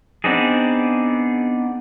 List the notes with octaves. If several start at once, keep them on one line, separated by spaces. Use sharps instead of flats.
B3 C4 D4 D#4 G#4